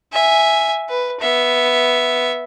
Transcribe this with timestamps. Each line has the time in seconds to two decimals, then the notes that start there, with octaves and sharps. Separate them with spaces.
0.13 E5 G#5
0.89 B4
1.21 B3 E5